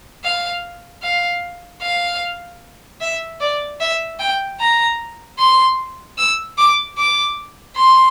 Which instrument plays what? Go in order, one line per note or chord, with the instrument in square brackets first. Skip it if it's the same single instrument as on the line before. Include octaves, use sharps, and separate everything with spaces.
[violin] F5
F5
F5
E5
D5
E5
G5
A#5
C6
E6
D6
D6
C6